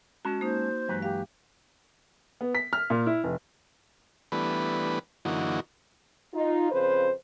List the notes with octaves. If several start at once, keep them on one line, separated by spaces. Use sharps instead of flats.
G#3 C#4 F#4 A5
A#3 D#4 C5
G2 E3 F#3 G#3 B4
G4 F5
B3
B6
F6
A#2
E4
F1
E3 G3 A3 B3 D4 B4
F#2 D3 E3 A#3 D#4 F#4
D#4 F4
F2 C#3 B4 C5